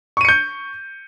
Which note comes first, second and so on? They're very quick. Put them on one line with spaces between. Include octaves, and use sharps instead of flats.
C#6 D#7 C#7 G6